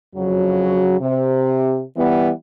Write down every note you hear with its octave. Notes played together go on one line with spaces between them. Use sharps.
F2 C#3 F#3
C3
E3 G3 B3